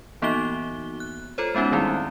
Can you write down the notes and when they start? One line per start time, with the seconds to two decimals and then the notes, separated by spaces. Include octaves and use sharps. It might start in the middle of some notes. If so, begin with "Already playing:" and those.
0.22 E3 A#3 B3 D#4 F#4 G7
1.00 F#6
1.38 F4 A4 C5 C#5
1.55 G#3 B3 C#4 D#4 F#4
1.72 D#3 G3 A3 C4 D#4 E4